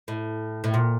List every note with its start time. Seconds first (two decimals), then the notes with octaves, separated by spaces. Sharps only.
0.08 A2
0.64 A2
0.74 A#2